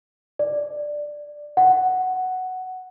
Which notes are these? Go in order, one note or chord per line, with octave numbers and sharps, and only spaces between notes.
D5
F#5